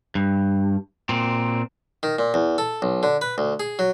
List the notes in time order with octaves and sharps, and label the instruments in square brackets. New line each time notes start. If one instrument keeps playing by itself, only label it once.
[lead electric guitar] G2
A#2 C4
[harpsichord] D#3
A#2
E2
A4
B1
D3
B4
D2
G#4
F#3